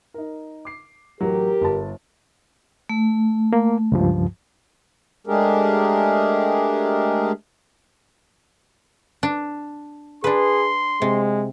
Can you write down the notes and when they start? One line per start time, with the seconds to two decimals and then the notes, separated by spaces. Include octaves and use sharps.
0.14 D#4 A#4
0.65 D6 C7
1.21 A1 F#3 G4 A#4
1.61 G1 A5
2.89 A3
3.53 A#3
3.92 C#2 G2 F3
5.27 G#3 A3 D4 G4 G#4 A#4
9.23 D4
10.24 D4 G#4 B4 C6
11.02 C3 G#3